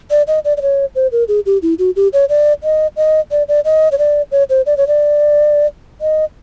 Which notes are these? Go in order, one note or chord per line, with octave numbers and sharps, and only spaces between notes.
D5
D#5
D5
D5
C#5
C5
A#4
G#4
G4
E4
F#4
G4
C#5
D5
D#5
D#5
D5
D5
D#5
C#5
D5
C#5
C5
D5
C#5
D5
D#5